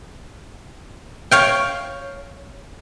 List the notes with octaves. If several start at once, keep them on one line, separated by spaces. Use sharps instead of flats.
C#5 F5 G5